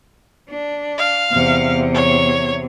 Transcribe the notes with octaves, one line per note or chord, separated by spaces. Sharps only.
D4
F5
E2 C3
C#5